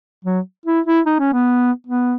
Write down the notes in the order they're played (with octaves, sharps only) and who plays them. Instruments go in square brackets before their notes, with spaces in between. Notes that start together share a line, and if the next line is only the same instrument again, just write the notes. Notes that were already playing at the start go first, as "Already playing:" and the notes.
[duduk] F#3
E4
E4
D#4
C#4
B3
B3